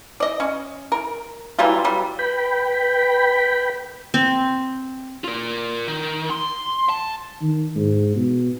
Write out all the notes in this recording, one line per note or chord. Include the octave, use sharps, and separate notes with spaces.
D5 D#5
C#4
A#4
E3 F#3 G3 F4
F#3 G3
B4 G5 B5
C4
F4 A#4
D#3
C6
A5
D#3
G#2
B2